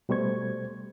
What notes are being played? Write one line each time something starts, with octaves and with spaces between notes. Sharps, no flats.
B2 G3 A3 C5 C#6 G#6